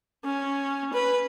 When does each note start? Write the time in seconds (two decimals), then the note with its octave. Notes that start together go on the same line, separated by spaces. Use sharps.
0.25 C#4
0.93 B4